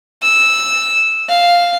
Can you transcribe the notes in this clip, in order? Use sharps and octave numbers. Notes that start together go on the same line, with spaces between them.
E6
F5